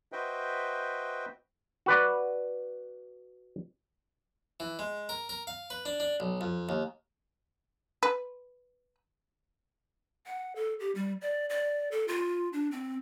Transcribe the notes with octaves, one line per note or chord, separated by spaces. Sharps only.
F#4 B4 C5 D#5 E5 G5
F#4 B4 D5
E3
G#3
A#4
A#4
F5
B4
D4
D4
B1
F2
D#2
B4
F#5
A4
G4
G3
D5
D5
A4
F4
D4
C4